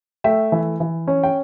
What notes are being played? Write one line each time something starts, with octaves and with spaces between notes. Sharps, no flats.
A3 E5 G5
E3
E3
C#4
G5